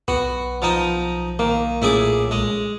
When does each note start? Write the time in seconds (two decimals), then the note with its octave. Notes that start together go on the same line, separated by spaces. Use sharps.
0.08 B1 B3 F#4
0.62 F3 D#4 D#6
1.39 D#3 A#3
1.82 A#2 A3 C#4 E4 G#4 D6
2.31 G#3